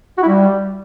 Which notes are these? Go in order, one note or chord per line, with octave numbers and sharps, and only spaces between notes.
F#4
E4
G3